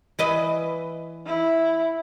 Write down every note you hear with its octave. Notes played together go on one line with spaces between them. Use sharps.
E3 B4 D#5
E4